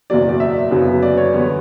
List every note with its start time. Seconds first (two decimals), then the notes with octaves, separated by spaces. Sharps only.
0.10 F#1 E2 B2 F#3 D5
0.29 D5
0.40 E5
0.71 G1 F#2 C#3 F#3 B3
1.03 D5
1.17 C#5
1.33 E2 D3 G3 B3